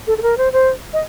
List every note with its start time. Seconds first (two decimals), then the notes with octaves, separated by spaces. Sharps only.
0.07 A4
0.18 A4
0.22 A#4
0.38 C5
0.52 C5
0.93 D#5